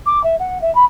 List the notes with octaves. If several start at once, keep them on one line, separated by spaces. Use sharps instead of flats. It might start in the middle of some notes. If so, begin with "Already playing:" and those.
D6
E5
F#5
E5
B5